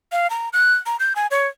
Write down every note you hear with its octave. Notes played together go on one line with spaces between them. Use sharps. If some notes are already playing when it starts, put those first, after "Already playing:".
F5
A#5
F#6
A#5
G6
G#5
C#5